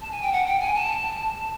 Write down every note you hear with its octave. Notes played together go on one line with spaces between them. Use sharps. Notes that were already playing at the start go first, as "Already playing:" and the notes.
A5
G#5
G5
F#5
G5
G#5
A5